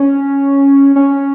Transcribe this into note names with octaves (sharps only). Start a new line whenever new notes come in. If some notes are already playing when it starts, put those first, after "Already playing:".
Already playing: C#4
C#4